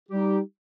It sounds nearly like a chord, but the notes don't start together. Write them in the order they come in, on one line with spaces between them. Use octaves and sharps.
G4 G3 D#4